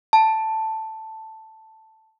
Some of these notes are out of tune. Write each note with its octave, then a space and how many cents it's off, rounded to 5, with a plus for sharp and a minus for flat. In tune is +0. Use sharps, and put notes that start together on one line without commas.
A5 +5